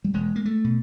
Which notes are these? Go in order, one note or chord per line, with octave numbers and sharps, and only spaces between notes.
G3
E1 G#3
A#3
A3
B2